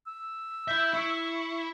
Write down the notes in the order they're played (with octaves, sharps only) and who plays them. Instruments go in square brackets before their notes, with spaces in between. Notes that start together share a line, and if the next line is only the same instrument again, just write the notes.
[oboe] E6
[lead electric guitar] E4 E5 [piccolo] G6
[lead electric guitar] E4 [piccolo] C#6